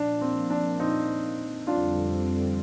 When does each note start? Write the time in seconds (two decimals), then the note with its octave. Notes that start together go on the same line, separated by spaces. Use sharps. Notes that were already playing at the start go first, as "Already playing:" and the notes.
Already playing: A#2 F3 A#3 D4
0.21 C4
0.50 D4
0.80 C4 D#4
1.67 F2 D3 G3 C4 D4 F4